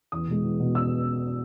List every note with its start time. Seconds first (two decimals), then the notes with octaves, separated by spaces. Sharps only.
0.12 E2 D#6
0.28 B2 G#3
0.44 E2
0.60 B2 G#3
0.75 E6